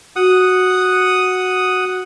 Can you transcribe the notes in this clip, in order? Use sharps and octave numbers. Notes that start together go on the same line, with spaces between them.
F#4 F#5 D#6